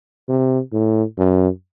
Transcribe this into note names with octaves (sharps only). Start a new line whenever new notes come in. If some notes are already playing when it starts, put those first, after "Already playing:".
C3
A2
F#2